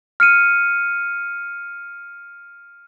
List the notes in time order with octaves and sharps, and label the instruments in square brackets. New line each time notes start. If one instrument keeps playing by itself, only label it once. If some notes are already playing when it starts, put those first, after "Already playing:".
[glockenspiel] F6 C#7 D#7